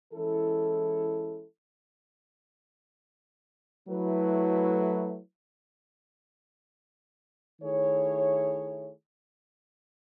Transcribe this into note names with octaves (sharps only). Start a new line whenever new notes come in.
E3 G#3 C#4 E4 A4
F#3 A3 E4 B4
D#3 A3 E4 G#4 C#5